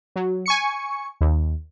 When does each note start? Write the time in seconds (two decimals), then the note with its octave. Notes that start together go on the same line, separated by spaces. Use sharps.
0.16 F#3
0.46 G#5 C#6 C#7
1.21 D#2